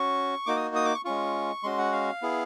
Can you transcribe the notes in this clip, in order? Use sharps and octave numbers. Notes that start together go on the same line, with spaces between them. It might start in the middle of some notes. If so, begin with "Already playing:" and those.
Already playing: C#4 F#4 C#6
A#3 D#4 F#4 D6
D#6
D#6
D6
C#6
G#3 C#4 F4 C#6
G#3 C#4 F#4 C6
F#5
F5
B3 E4 G#4